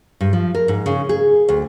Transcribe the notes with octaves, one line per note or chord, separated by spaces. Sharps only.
G2
F3
A#4
G#2
C#3
G#4
D2